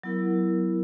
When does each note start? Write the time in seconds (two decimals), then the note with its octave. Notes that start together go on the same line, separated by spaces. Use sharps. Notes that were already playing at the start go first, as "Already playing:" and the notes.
0.03 F#3 B3 E4 A#4